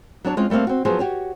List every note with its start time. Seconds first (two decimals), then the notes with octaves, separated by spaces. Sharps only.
0.24 F#3 D4 C#5 A5
0.37 G#3 C4 C#4 F4
0.50 G3 A3 A#3 C4 F5
0.67 C4 F#4
0.85 F3 F#3 B3 G#4 C5
0.99 F#4 G4 C#5